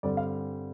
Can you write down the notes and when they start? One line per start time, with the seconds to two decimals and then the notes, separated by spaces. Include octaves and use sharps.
0.03 G2 D3 G3 C4 D5
0.17 F5